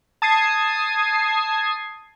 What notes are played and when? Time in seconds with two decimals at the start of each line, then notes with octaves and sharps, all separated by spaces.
0.22 A5 D#6 G#6 C7